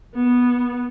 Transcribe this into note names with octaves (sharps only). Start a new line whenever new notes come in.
B3